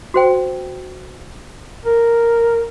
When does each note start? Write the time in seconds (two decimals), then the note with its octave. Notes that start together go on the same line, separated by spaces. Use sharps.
0.14 F#4 C5 G5
1.85 A#4